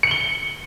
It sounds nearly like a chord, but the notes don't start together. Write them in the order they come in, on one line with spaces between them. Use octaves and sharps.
C#7 F#7 G7